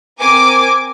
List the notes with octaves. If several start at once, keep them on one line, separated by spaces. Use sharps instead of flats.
C4 A#4 G#5 D6